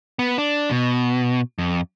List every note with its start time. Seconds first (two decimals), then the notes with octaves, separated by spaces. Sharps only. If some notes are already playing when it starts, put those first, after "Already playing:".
0.19 B3
0.38 D4
0.71 B2
1.58 F2